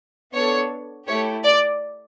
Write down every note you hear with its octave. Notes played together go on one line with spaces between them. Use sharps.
B3 D4 A4 C#5
A3 E4 G4 C#5
D5